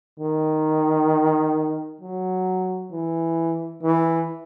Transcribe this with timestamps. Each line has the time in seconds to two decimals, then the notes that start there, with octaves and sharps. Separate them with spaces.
0.19 D#3
2.01 F#3
2.92 E3
3.83 E3